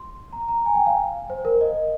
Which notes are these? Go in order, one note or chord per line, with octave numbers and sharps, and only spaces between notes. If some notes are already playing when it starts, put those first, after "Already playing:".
Already playing: C6
A#5
A#5
G#5
G5
F5
C5
A#4
D#5